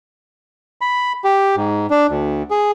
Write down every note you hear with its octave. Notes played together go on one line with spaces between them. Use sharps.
B5
G4
G#2
D4
D2
G#4